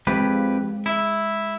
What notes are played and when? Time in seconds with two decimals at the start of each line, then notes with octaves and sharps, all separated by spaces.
0.07 F2 G#3 G4 B4
0.86 E4